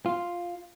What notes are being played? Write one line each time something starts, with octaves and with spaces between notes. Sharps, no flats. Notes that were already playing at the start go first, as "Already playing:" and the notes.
F4